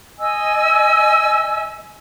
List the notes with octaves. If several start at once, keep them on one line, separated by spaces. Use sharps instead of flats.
D#5 G#5 E6